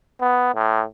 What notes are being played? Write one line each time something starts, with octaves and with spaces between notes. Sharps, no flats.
B3
A2